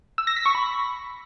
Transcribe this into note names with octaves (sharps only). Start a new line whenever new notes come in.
E6
A#6
B6
C#6
B5